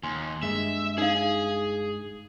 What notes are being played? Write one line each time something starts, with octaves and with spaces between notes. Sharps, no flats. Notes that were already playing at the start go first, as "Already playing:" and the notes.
D#2 G#5 C6
G2 G#3 E5
D#4 G#4 F5